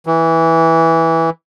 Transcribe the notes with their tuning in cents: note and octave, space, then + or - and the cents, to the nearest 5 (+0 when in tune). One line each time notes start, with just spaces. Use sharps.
E3 -10